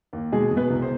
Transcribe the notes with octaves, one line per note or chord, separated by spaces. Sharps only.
D#2
B2 G#3 G#4
B2
B3 B4
C2
C5